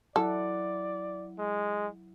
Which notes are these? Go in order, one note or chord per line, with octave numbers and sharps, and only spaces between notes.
F#3 E4 A4 D5 F#5
G#3